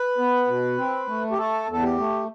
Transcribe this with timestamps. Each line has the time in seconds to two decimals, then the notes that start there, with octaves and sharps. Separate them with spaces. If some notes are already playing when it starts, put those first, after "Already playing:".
Already playing: B4
0.18 B3
0.47 B2
0.78 C4
1.08 A3
1.32 G4
1.38 A3 A4
1.68 E2 A4
1.83 G4
1.98 A3